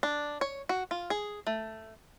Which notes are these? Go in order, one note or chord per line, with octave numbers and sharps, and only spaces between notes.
D4
C#5
F#4
F4
G#4
A3